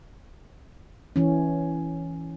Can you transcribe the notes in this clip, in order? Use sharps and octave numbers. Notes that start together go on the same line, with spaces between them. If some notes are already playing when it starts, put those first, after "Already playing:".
E3 C#4